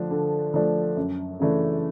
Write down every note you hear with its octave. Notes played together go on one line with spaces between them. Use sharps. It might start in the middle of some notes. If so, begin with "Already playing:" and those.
Already playing: D3 F3 A3 D4
D3
F3 A3 D4
F#2
C#3 E3 A3 D4